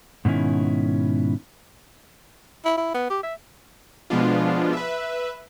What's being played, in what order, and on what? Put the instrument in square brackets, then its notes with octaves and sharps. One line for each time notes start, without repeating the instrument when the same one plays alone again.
[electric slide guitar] G#2 B2 D#3 C#4 E4
[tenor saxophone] E4
E4
B3
G4
E5
[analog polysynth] B2 F3 G#3 B3 D4 F4
B4 E5